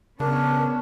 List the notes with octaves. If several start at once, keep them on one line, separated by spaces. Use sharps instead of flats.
C#3 B3 C#4 D4 A#4